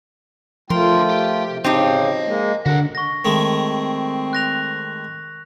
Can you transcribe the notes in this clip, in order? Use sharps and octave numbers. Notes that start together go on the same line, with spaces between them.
D3 F3 A3 F4 A#4 G5 C6
G4
C3
C#3 C4 D#4 G4 D#5 A5
G#3 A#3
D3 F#4 A#4 F#5
C#6 A#6
D#3 G#3 A3 C4
F#6 A#6 F7